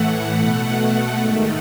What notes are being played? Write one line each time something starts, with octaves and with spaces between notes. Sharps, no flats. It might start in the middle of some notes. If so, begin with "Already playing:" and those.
Already playing: A2 E3 A3 F#5
B2 A3 F#5
G#2 D#3 A3